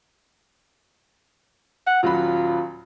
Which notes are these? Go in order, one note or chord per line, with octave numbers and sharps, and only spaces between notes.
F#5
D#1 F#3 F4 B5